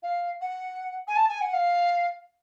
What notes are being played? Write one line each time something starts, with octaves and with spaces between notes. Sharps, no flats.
F5
F#5
G#5
A5
G#5
F#5
F5